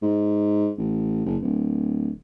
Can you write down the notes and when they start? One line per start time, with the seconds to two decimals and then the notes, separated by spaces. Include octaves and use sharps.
0.02 G#2
0.78 A1
1.26 F#1
1.42 D1